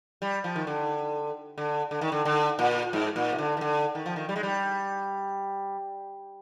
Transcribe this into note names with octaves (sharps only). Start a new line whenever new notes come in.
G3
F3
D#3
D3
D3
D3
D#3
D3
D3
A#2
G#2
A#2
C3
D3
D#3
D3
D#3
F3
D#3
G3
G#3
G3